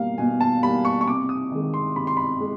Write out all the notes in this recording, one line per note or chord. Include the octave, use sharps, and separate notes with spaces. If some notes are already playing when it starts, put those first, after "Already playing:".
Already playing: B2 G3 A#3 F5
B2 G#5
A5
G3 A#3 B5
C#6
C#6
C3 D6
D#6
D#3 G#3
C6
C3 B5
C6
B5
G#3